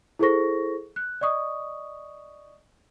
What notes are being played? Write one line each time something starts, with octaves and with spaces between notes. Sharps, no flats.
E4 G#4 A4 C5 C#6 A#6
F#6
D5 D#5 C#6 D#6